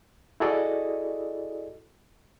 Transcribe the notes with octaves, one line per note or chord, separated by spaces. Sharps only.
E4 F#4 G#4 A4 D5 D#5